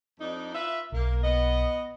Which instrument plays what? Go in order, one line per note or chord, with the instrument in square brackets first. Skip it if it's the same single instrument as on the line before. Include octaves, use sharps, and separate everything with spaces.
[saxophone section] F2 D4 D#4
F4 B4 E5
[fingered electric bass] B1 [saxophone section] A#3
[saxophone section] B3 D#5